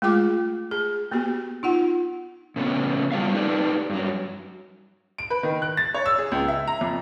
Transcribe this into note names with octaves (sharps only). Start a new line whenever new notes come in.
G#3 A3 F4 G#4 G5 D6
G#4
A#3 B3 F#4 G4
D#4 F4 F#5
A#2 C#3 A3 B3
F#3 G3 C4 F4 E5 F5
D#4 G4 A4 B4 D5
G2 F#3
D7
B4
D#3
F#6
A6
C#5
E6
G#4
C#2
E5
A#5
F2